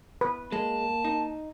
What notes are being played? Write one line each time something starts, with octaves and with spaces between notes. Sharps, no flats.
B4
G#3 A#3 A5
D#4